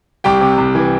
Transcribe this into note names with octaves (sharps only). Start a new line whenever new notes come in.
C2 G4 G5
C3
C2
E3